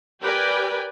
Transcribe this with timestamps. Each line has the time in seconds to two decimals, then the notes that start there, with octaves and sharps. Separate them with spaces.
0.21 G4 A#4 B4 D5 G5 G#5